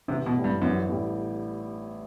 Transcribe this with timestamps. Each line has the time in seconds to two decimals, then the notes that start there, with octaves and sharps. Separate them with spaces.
0.08 A1 C3
0.26 B2
0.35 A2 G3
0.44 G2
0.62 A1 F#2
0.89 A2 G3